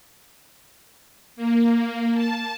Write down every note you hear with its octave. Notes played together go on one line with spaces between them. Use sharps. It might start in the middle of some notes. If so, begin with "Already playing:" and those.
A#3
A5